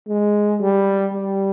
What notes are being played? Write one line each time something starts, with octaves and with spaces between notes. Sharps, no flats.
G#3
G3
G3